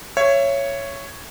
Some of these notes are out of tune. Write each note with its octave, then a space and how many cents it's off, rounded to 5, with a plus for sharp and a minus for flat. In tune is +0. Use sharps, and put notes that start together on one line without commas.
C#5 +0 E5 +30